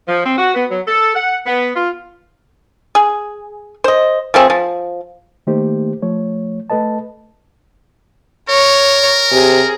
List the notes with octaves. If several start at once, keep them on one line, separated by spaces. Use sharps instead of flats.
F3
C4
F#4
B3
F#3
A4
F#5
B3
F4
G#4
C5 D#5
F3 A3 C4 G#4
F3
D#3 A3 A#3 D#4 G4 C5
F3 A3 C#5
A3 A4 B4 D#5 A5
A#4 C#5
C3 G#4